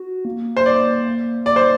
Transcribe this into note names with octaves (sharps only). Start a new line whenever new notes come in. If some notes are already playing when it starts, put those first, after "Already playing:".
Already playing: F#4
A#3
C5
D5
D5
C5